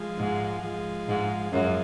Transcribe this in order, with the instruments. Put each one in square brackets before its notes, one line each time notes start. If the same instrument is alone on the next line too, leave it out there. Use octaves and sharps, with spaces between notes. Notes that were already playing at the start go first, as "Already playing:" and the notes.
Already playing: [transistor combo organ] F3 G#3
[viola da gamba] G#2
[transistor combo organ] F3 G#3
[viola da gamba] G#2
[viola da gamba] F#2 [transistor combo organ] F3 G#3